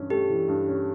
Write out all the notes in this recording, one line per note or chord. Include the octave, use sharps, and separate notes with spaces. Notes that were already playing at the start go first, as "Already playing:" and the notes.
Already playing: G2 E3 C#4
A3 G4
E3
G2
C#4